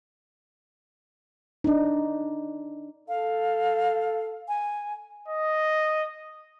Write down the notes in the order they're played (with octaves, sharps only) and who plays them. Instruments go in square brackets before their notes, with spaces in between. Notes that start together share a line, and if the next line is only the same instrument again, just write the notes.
[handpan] D4 D#4
[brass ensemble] A4 [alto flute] F5
[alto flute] G#5
[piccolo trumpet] D#5